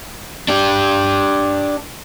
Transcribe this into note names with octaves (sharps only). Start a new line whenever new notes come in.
D4 G4